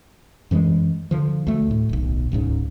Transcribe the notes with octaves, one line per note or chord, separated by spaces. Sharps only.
F#2 E3 F#3 G#3
D3 F3
D2 A3
A2
D1 B1
D1 C#2 G#2 C#3